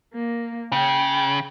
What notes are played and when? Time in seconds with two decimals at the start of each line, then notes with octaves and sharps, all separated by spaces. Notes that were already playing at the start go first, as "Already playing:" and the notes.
0.12 A#3
0.72 C#3 G5